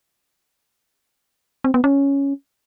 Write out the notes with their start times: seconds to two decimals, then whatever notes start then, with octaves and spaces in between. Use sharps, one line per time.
1.64 C4
1.74 B3
1.84 C#4